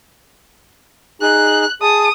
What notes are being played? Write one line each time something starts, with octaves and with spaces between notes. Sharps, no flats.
D#4 G#4 F#6
G#4 A5 D#6